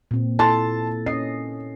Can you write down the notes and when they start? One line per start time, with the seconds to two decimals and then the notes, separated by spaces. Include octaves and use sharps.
0.11 A#2 C4
0.39 E4 A4 A5 C6 A6
1.06 C#4 D#5 C7